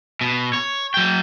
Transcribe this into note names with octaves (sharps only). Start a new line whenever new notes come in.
B2
C#5
F#3 G5